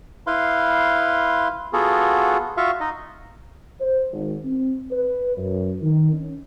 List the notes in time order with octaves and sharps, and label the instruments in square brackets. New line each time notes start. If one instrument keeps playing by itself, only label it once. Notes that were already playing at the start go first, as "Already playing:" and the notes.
[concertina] E4 B4 F5 C6
B3 F4 F#4 G#4 A4
F4 F#4 E5 F5 C#6
D#4 D#5
[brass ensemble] C5
G#1
C4
B4
F#2
D#3
C#4